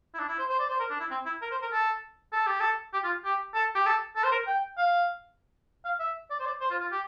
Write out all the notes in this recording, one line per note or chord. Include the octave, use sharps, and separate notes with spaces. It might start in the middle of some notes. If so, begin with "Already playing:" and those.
E4
D4
E4
C5
C5
D5
C5
A#4
D4
E4
C4
E4
A#4
C5
A#4
A4
A4
G4
A4
G4
F4
G4
A4
G4
A4
A4
C5
A#4
G5
F5
F5
E5
D5
C5
D5
C5
F4
F4
G4